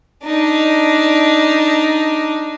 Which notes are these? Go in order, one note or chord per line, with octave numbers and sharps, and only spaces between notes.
D4 D#4